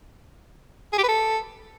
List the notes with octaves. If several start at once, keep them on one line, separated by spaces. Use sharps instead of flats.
G#4
G4
B4
A4